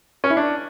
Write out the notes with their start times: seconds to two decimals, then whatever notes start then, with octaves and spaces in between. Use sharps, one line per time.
0.24 C#4
0.30 E4
0.37 D4